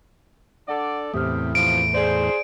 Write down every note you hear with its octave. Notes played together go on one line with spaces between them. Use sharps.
D4 A4 D5 F#5
E2 A2 C3 G4 D#6 F6
C3 E3 F3 D7
G#4 C5 D5